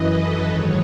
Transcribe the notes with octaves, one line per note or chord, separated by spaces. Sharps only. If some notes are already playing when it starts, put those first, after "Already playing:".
Already playing: F#2 E3 B4 D#5
A4
G#2 D#3 F#3 C#5